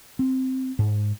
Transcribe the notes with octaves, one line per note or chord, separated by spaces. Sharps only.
C4
G#2